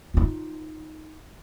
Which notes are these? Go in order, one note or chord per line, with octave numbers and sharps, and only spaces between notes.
D#4 F4